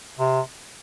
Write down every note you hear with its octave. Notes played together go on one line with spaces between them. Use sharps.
C3